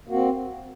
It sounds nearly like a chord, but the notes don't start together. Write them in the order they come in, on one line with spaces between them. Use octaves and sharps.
A#3 F#4 C4